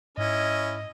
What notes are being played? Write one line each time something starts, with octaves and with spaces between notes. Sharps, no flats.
G#2 C#4 E4 D#5